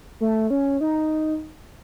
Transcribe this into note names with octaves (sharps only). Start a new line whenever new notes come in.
A3
C#4
D#4